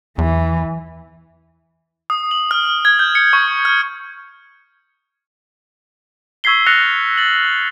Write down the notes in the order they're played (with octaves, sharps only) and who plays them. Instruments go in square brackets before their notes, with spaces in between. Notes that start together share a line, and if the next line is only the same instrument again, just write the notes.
[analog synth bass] E2 [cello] E3
[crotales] D#6
F#7
F6
G#6
G6
C#7
C#6
F6
C#6 E6 G#6 B6 C7 G7
F6 F#6 A6 A#6 C#7 F7
A6 F#7